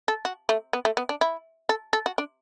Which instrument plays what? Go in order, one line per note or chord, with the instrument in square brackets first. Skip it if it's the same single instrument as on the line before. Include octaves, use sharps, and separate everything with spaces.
[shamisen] A4
F#4
A3
B3
A3
B3
D4
E4
A4
A4
F#4
D4